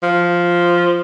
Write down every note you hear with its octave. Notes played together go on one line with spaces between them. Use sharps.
F3